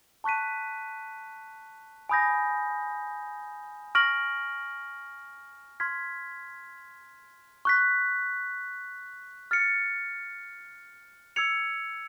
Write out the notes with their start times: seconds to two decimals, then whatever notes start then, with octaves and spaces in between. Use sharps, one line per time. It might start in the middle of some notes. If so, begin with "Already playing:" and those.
0.24 A5 C#6 F#6 B6 D#7
2.09 G#5 B5 D#6 G6 A#6
3.95 C#6 F6 A#6 D7 F#7
5.80 C6 F6 G#6 B6
7.65 C#6 F#6 B6
9.51 F6 A6 C#7
11.36 E6 G#6 C#7 F7